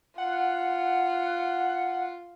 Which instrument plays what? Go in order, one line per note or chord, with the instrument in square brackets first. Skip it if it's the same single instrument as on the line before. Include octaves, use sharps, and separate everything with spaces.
[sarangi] F4 [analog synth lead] F#5